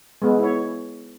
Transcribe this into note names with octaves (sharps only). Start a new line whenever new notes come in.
G#3 B3
E4 C#5